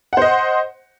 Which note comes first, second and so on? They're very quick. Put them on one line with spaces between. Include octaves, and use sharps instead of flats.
F#5 C5 D#5